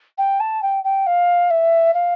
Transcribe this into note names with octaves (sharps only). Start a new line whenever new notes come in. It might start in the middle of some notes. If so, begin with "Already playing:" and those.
G5
A5
G5
G5
F5
E5
F5